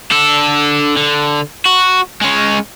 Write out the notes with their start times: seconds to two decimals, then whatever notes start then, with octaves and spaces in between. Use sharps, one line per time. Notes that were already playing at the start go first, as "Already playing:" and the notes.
0.11 D4 A4
0.97 D3
1.65 F#4
2.21 G#3 C#4